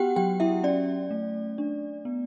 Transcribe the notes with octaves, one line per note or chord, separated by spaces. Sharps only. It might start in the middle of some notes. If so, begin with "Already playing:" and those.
Already playing: B3 F#4 G4 F#5 G5
F#3 G4 G5
E4 E5
C#4 D5
A3
D4
B3